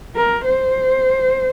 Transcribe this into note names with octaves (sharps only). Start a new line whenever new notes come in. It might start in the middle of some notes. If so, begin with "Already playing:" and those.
A#4
C5